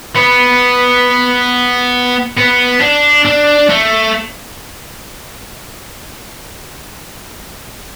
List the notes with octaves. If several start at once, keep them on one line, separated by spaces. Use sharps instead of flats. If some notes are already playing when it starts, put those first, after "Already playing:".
B3
B3
D4
D4
A3